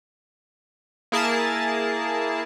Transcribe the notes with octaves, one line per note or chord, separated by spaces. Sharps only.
A#3 E4 G#4 A#4 A5